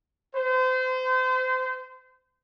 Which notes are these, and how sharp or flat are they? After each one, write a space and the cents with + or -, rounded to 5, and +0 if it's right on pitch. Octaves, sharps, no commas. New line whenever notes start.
C5 -30